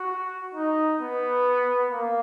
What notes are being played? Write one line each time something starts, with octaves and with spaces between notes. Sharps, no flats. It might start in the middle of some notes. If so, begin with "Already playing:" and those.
Already playing: F#4
D#4
B3
A#3